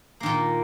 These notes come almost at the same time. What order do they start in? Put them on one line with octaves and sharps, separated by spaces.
A#3 D#3 A#2